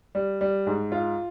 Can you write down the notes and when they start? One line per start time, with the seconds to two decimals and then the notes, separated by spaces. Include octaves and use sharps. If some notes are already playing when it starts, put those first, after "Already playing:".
0.15 G3
0.41 G3
0.67 G#2
0.92 F4